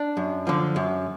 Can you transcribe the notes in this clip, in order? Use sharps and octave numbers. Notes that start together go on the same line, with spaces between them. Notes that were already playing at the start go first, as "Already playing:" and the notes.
Already playing: D4
F#2
D3 F3
F#2